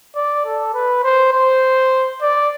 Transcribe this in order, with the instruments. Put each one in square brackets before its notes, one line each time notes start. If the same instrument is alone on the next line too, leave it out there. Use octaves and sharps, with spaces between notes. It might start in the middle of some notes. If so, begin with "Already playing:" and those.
[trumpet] D5
A4
B4
C5
C5
D5